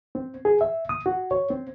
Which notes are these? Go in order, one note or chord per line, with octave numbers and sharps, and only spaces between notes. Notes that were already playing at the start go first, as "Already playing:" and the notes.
C4
G#4
E5
D#6
F#4
C#5
C4